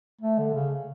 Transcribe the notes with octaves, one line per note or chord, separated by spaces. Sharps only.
A3
D3
C#3